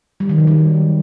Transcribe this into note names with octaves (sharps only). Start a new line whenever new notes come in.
G3
D#3
F#3
G3